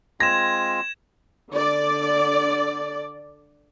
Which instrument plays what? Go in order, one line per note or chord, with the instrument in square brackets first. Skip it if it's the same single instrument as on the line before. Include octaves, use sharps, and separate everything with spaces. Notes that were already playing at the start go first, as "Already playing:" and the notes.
[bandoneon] G#3 C4 F4 [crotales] G#6 E7 [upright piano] A#6
[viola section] D3 D5